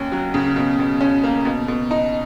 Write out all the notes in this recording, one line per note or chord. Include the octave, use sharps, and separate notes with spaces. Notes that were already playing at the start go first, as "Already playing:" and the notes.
Already playing: D#2 C#4
F#3
C#3
B2
B2
C#4
A#3
B2
B2
D#4